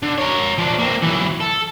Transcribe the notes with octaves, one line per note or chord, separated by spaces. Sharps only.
D3
A#4 C#5
F3 D4
A#3 C4
E3 F#3
A4